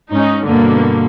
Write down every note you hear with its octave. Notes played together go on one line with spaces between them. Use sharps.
G#2 C#4 D#4
G2 B2 D3 A#3